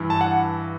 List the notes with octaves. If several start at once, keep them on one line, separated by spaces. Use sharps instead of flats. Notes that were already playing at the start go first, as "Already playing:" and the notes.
Already playing: G2 E3
A5
F#5